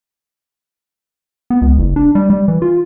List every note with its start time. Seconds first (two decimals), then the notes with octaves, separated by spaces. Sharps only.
1.50 B3
1.62 C#2
1.78 F#1
1.96 D4
2.15 G3
2.30 G3
2.48 E3
2.62 F4